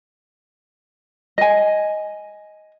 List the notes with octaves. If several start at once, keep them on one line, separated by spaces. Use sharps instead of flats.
D#5 G#5